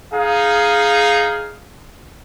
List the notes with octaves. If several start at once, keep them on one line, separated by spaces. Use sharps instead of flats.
D#4 G#4 F5